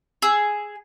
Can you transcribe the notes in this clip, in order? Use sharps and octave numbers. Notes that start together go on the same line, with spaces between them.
G#4 E6